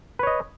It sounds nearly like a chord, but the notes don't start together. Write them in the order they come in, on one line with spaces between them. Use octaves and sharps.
B4 C#5 D#5